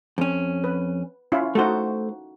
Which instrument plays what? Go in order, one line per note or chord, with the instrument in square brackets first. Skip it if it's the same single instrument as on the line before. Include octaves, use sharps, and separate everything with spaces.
[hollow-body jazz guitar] F2 C#4
[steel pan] B4
C#4 E4 F4
[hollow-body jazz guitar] A3 C5 [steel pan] D#4 F#4 A4